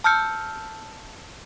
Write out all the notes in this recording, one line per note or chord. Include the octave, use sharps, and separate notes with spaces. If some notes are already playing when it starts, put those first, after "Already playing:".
A5 E6 F6 G6 C#7